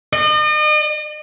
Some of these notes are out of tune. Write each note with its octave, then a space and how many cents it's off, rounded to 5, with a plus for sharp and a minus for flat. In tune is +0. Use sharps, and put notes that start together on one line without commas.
D#5 -40